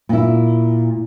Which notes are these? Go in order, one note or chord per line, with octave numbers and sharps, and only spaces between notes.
A#2 E4